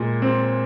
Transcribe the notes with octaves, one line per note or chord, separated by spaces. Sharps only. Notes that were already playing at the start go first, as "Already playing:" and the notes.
Already playing: A#2 G#3
C4